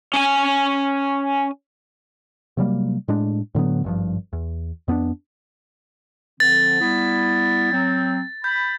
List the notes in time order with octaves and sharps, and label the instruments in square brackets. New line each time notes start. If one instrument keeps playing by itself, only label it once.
[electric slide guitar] C#4 D4 G#5
[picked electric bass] C3 F#3 G3 A#3
A2 G#3 D4
A2 D3 F#3 B3
G#1 G2 F3
E2
F2 B3 C#4 D4
[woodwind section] D3 F3 C4 [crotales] A6
[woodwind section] G3 B3 E4
F#3 C4
[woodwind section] B5 [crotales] G6